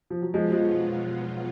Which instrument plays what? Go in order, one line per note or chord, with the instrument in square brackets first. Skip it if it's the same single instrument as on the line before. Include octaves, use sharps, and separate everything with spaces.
[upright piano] F3
F#3
[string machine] B2 F#3 B3 F4 [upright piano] F3 G#3
[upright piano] F3 G#3